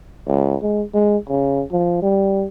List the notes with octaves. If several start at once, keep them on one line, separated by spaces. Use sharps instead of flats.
C#2
G#3
G#3
C#3
F3
G3